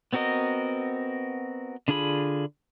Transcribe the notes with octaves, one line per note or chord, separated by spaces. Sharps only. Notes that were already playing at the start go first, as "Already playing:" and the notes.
B3 C4 F#4 A#4 D#5
D3 D4 F4 G#4 B5